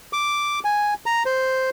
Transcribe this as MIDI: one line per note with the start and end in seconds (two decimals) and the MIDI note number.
0.13 0.60 86
0.65 0.94 80
1.06 1.23 82
1.26 1.70 72